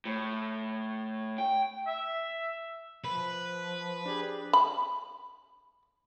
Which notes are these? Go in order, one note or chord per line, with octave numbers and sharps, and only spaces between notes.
A2
G5
E5
F3 B4
D4 G4 G#4
B5